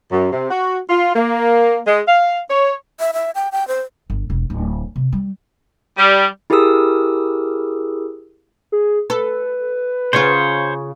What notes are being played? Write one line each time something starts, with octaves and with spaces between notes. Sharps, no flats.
F#2
C3
F#4
F4
A#3
G#3
F5
C#5
E5
E5
G5
G5
C5
G1
E1
D1
C3
G3
G3
E4 G4 G#4 A#4 D#6 E6
G#4
A4 B4
C#3 F4 C5 C#5